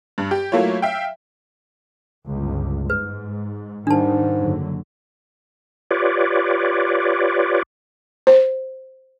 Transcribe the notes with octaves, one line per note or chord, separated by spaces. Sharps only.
G2
G4
F#3 A3 A#3 E4 F4 C#5
E5 F5 G5
G1 C#2
G#2 B4
G#2 D#3 G3 D4 A5
F#1 D3 F#3
F4 G4 B4 C#5 D5
C5